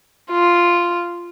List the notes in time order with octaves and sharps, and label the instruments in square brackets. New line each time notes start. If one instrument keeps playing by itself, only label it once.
[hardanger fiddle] F4